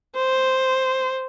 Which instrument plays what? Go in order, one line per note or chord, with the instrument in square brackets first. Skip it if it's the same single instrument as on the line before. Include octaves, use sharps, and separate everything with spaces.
[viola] C5